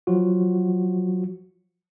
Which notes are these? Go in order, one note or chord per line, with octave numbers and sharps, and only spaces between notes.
F3 F#3 F4 F#4